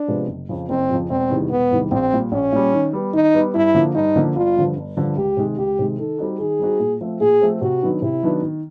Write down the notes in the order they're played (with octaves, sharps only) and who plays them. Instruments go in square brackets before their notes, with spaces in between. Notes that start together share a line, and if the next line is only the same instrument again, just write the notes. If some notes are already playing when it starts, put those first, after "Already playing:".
Already playing: [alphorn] D4
[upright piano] C3 F3 G#3 B3
F#1
F2 C#3 F3
[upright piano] F#1 [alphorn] C4
[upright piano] F2 C#3 F3
[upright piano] E1 [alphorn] C4
[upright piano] E2 C3 D#3 G3
[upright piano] E1 [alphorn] B3
[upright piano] E2 C3 D#3 G3
[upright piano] A#1 [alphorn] C4
[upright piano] A#2 G3
[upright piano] A#1 [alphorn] C#4
[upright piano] A#2 G3
D#3
G3 B3
[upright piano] D#3 [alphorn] D#4
[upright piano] G3 B3
[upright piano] G2 [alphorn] E4
[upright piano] D3 F3 A#3
[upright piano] G2 [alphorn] D#4
[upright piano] D3 F3 A#3
[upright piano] G1 [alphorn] F4
[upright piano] G2 D3 F3
G1
G2 D3 F3
[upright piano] C#2 [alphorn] G4
[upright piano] C3 D#3 G#3
[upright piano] C#2 [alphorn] G4
[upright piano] C3 D#3 G#3
[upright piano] D#3 [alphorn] A4
[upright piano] G3 C4 D#4 F#4
[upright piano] D#3 [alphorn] G#4
[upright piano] G3 C4 D#4 F#4
A#2
F3 A3 C4
[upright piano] A#2 [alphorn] G#4
[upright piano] F3 A3 C4
[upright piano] C3 [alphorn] F#4
[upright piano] D#3 F#3 B3 D4
[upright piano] C3 [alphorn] E4
[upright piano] D#3 F#3 B3 D4
D#3